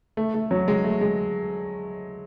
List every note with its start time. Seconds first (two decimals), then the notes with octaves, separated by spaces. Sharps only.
0.17 A3
0.34 A3
0.51 F#3
0.68 G#3
0.84 A3
1.01 G#3